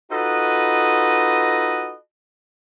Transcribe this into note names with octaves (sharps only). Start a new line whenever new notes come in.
D#4 F4 F#4 A4 B4 D#5